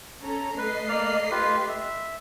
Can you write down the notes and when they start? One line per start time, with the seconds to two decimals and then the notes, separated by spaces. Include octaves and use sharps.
0.21 C#4 A4 A#5
0.58 A3 B4 D#5 C7
0.89 A#3 D5 F6
1.31 F4 G4 B4
1.68 E5